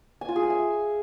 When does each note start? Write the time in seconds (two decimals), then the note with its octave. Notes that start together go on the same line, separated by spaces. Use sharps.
0.21 G#5
0.29 F4
0.36 G#4
0.43 G#5
0.50 E5